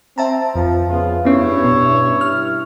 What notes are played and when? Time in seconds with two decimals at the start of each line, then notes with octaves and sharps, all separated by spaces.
0.18 C4 E5 A5 A#5
0.55 F2 F3
0.90 C#3 B3 F4
1.25 G2 B3 C#4 E4 C#5
1.65 B2
2.21 F6